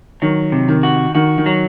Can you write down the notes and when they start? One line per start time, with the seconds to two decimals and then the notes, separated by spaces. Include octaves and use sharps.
0.22 D#3 F#3
0.52 C3
0.68 D#3
0.83 F#4
1.15 D#3 F#4
1.38 D#3
1.46 F#3